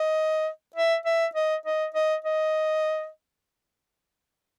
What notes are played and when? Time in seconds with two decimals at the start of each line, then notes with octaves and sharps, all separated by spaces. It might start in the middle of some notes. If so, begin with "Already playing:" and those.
Already playing: D#5
0.76 E5
1.05 E5
1.35 D#5
1.66 D#5
1.94 D#5
2.24 D#5